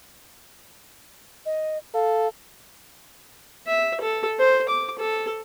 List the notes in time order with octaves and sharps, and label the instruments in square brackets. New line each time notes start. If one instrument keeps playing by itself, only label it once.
[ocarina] D#5
[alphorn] A4 [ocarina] F5
[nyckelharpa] E5
A4
C5
D6
A4